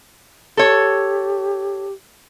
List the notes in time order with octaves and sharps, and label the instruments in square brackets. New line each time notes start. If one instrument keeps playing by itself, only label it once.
[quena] G4 [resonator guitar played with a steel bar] A4 C#5